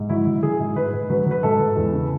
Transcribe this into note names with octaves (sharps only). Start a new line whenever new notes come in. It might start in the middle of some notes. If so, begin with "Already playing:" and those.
Already playing: G#2
F#3 E4
F#3
F#3 G#4
G#2
G#2 B4
G#2
F#3 B4
F#3 B4
G#2 A4
G#2
E2
C#3